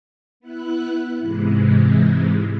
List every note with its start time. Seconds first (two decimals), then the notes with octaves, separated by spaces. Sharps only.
0.40 B3 E4 F#6
1.19 G#2 C3 E3 G#3